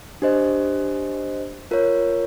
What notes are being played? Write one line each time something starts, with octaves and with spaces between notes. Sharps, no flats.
D4 G4 C5 D#5
F4 A#4 C#5